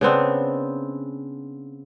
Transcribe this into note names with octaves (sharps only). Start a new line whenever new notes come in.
C#3 B3 C4 D4